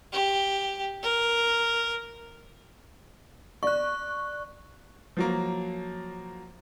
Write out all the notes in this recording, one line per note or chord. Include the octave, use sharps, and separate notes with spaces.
G4
A#4
D5 C#6 F#6
F3 F#3 A#3